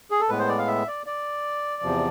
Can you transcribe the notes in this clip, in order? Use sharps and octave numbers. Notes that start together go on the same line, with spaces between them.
G#4
A4
A2 G#3 B3 B4
C5
D5
F5
E5
D5
D5
E2 C3 F3